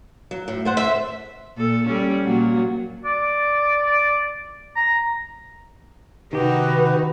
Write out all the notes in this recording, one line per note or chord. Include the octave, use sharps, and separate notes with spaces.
F#3
A2
A3 C5 F#5
C5 E5
A#2 A4
G3 C#4
A#2 F#3 A#3
D5
A#5
C3 D#3 D#4 F#4 G4 B4